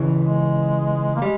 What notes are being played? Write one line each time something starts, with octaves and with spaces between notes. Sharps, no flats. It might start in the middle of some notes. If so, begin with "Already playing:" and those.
Already playing: C#2 C#3 E3
G#3
A#3
G3 G#3